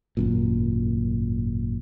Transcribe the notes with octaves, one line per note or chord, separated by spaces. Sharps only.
G#1 F#2 A#2